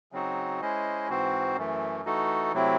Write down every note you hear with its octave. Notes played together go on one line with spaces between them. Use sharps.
C#3 F#3 C4 D#4 F#4
G#3 C#4 E4 C5 D#5
G#2 E3 C4 F#4 C5
F#2 E3 A3
E3 A3 D#4 F#4 A4
C3 F#3 A3 C4 E4